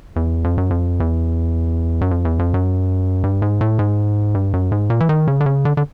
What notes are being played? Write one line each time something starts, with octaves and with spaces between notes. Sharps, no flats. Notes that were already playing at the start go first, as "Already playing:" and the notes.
E2
F2
F#2
F2
E2
F#2
F2
E2
F2
F#2
G2
G#2
A2
G#2
G2
F#2
G#2
A#2
E3
D#3
C#3
D3
C#3
D3
D3